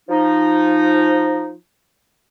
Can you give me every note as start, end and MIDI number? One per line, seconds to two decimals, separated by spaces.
0.09 1.53 53
0.09 1.53 63